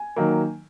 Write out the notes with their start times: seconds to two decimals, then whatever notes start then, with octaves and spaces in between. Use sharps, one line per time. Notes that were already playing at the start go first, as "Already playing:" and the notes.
Already playing: G#5
0.16 D#3 F#3 A#3